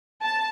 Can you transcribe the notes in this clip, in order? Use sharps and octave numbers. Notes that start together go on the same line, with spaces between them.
A5